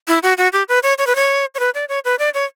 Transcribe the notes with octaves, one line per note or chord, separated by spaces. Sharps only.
E4
F#4
F#4
G4
B4
C#5
C#5
B4
C#5
C#5
B4
D5
C#5
B4
D5
C#5